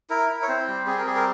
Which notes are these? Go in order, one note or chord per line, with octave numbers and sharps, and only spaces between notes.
E4 A#4
E4
C#5
C4 C5
G3
C4 G#4
A#4
G3 G#4
A#4